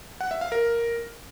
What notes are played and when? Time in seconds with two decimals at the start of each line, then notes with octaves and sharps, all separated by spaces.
0.21 F#5
0.31 E5
0.41 F5
0.52 A#4